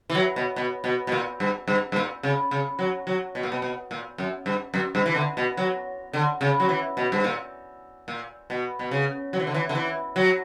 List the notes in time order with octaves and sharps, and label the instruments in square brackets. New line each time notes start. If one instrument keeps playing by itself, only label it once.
[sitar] E3
F#3
B2
B2
B2
B2
A#2
G2
G2
G2
A#2
C#3
C#3
F#3
F#3
B2
A#2
B2
B2
A#2
F#2
G2
F#2
G2
E3
D3
B2
F#3
D3
C#3
F#3
E3
B2
G2
A#2
A#2
B2
B2
C#3
F#3
E3
D3
E3
D3
E3
F#3